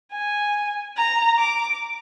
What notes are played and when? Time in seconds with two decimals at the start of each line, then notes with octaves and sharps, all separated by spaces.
0.12 G#5
0.96 A#5
1.38 D6